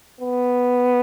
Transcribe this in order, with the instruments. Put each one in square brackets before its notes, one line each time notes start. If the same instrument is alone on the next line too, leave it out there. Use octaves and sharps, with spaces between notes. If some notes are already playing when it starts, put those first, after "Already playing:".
[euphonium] B3